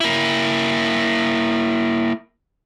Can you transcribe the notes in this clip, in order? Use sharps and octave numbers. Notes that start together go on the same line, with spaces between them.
A#3 E4